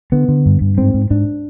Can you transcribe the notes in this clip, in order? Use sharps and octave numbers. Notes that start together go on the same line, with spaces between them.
D3 B3
D3
G2
G2
G#2 C4
G#2
G#2 D4